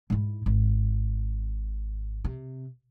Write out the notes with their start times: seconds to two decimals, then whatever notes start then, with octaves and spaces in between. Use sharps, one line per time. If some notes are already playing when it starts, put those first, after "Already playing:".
0.10 G#2 E4
0.46 G#1
2.24 C3